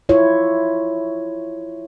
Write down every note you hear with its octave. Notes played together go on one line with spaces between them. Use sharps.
E4 F4 C#5